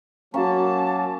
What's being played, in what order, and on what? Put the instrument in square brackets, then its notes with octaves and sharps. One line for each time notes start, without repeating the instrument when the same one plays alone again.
[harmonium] F#3 A#3 [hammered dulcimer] C#4 [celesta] F#4 F5 A#5 [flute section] A5